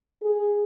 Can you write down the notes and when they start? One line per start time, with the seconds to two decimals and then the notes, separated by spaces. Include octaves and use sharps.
0.22 G#4